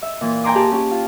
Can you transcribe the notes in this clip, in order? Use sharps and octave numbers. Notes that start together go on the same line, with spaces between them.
E5
A#2 E3
G5 G#5 A#5 C6 D6 D#6
G4 G#4 A5
C#4 G4
F4